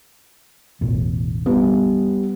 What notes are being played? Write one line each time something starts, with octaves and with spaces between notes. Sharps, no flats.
E1 A1 E2
G3 B3